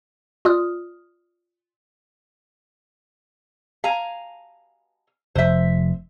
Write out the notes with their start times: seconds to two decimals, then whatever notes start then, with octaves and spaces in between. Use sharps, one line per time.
0.45 F4 D5 D#6 F6
3.84 F5 G#5 A#5
5.35 F1 C5 E5